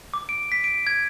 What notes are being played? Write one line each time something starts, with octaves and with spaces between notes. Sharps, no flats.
D6
D7
B6
D7
G#6